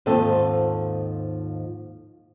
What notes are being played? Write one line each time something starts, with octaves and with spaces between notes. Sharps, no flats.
D#2 G#2 F3 C4 A4 D#5